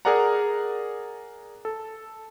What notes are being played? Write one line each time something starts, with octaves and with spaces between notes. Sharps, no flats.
G#4 A#4 D5 F#5 A#5
A4